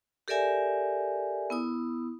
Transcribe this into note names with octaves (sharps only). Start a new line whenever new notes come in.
G4 A4 A#4 D5 E5 G#5
B3 E4 D#6